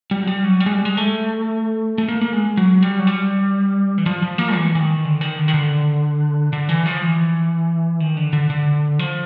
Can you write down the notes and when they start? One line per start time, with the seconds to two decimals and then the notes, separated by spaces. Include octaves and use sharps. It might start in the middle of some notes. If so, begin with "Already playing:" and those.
0.11 G3
0.23 F#3
0.27 G3
0.44 F#3
0.60 G3
0.66 G#3
0.73 G3
0.85 G#3
0.97 A3
1.98 A3
2.08 A#3
2.21 A#3
2.33 G#3
2.57 F#3
2.83 G3
2.99 F#3
3.07 G3
3.98 E3
4.06 F3
4.22 F3
4.38 A#3
4.55 E3
4.75 E3
4.79 D#3
5.04 D3
5.21 D#3
5.38 D3
5.48 D#3
5.54 D3
6.53 D3
6.69 E3
6.86 F3
7.02 E3
8.00 D#3
8.17 D3
8.33 D3
8.50 D3
8.99 F3